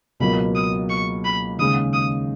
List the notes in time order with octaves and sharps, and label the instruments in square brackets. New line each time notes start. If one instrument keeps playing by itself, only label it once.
[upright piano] C#2 B2 F#3 A#3 [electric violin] B5
[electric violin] D#6
C#6
B5
[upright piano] D#2 C#3 G#3 [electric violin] D#6
[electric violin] D#6